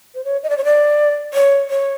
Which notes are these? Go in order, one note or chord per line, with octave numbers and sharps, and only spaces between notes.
C5
C#5
D#5
D5
C#5
D5
C#5
C#5